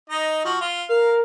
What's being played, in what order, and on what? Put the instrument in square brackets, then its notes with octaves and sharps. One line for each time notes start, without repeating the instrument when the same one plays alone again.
[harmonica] D#4 D#5
F3 F#4
F4
[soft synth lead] A#4 [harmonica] F5
[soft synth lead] A#4